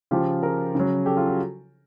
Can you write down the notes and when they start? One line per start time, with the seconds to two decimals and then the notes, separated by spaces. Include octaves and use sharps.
0.11 C#3 F3 F4 G4
0.43 G#4 A#4
0.75 C#3 F#3
1.06 G4 A4
1.17 F4
1.27 F#4